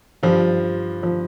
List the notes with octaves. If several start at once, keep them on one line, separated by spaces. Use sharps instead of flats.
G2 F3 F4
F3